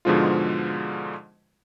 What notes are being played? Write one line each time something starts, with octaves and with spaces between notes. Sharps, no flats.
G#2 B2 D3 F3 G#3 F4